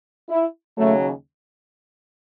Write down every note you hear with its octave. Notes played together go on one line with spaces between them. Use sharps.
E4
D#2 C#3 F#3 A3